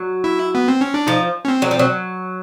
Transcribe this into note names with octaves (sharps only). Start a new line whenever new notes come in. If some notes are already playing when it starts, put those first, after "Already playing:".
Already playing: F#3
E4
B3
C4
C#4
D4
F3 D#4
C#4
C4
F#3
F3
F#3